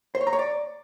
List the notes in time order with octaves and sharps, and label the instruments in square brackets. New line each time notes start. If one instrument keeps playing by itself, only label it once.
[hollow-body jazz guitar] C5
C#5
A#5
C#5
D5